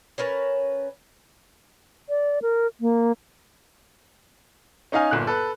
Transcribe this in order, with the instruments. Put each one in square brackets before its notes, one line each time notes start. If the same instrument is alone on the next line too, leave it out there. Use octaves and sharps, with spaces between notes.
[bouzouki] C#4 A#4 B4 A5
[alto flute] D5
A#4
A#3
[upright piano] C#4 D#4 D#5 F5 G#5
G1 A#2 F#6
A4 B4